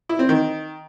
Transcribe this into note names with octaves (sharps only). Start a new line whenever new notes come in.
E4
C4
D#3